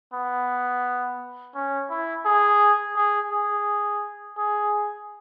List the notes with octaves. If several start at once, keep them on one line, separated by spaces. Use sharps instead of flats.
B3
C#4
E4
G#4
G#4
G#4
G#4